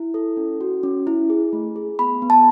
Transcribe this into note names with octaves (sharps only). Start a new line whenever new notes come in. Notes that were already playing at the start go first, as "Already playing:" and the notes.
Already playing: E4
A4
C#4
F#4
C#4
E4
G#4
A3
G#4
B3 B5
B3
A5